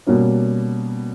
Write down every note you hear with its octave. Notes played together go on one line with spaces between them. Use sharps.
B2 G3 A#3 C#4